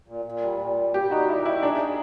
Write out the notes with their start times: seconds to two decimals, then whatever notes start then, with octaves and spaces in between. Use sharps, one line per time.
0.08 A#2
0.25 A#2
0.42 G3
0.60 A#2
0.77 G3
0.94 G3 G4
1.11 D#4 F#4
1.28 A#2 E4
1.45 D#4 E4
1.63 D4 G#4
1.80 G#4